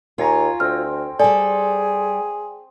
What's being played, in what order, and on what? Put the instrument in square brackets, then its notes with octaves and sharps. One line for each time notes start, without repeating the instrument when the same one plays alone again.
[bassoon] D#2 [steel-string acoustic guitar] F4 [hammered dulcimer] C#5 G#5 A#5
[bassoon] D2 [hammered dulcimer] C4 G5 [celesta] F6
[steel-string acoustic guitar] G3 A4 [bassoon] G#4 [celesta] D5 G#5